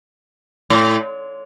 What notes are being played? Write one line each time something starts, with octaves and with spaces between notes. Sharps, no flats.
A2